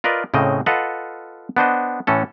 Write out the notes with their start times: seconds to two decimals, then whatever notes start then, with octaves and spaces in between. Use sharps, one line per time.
0.04 F4 A#4 B4 D5 D#5
0.34 A2 C#3 C4 D#5
0.66 F4 A4 B4 D#5 F5 F#5
1.57 B3 D4 C5 D#5
2.07 A2 E3 C#4 A4